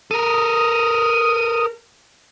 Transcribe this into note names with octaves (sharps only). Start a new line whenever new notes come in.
A4 A#4 D#6